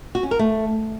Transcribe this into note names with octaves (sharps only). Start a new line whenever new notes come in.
F#4
C#4
A#4
A3